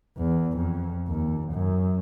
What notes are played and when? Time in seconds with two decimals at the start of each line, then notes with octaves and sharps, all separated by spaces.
0.18 E2
0.57 F2
1.07 D#2
1.52 F#2